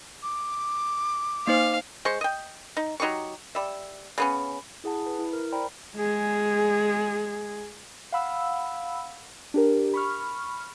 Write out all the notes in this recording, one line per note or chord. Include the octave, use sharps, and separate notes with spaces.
D6
A#3 D#4 C5 F5
G#3 C5 C#6
D#5 G5
D#4
F#3 D#4 G4 C#6
G3 E5
C#3 B3 C#4
E4 G#4 F#5 A5
B4
E4
A#4
C5 D5 G5 A#5 B5
G#3 G#4
F5 F#5 B5 E6
D4 G4 A#4
B5 C#6 F6